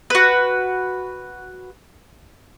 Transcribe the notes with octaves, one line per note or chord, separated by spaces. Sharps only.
F#4 B4